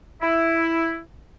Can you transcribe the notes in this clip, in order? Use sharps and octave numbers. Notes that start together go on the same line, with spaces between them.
E4